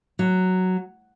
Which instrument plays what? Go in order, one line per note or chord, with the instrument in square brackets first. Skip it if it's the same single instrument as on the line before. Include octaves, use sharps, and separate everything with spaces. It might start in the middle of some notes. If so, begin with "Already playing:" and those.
[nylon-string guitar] F#3